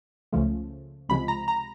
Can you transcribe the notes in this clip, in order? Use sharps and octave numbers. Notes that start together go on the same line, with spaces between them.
C#2 C#3 F3 A3
C#2 C3 F3 G#3 B5
A#5
A#5